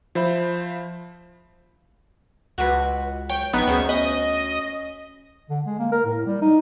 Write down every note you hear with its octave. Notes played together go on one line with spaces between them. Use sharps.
F3 C5 E5 B5
C#2 F#4 B4
C#5 G5
A#1 B3 D#4 C6 C#6
D2 C#4 G#4 C5
C#4 D#5 B5
D3
G#3
A#3
A#4
A2
G3
D#4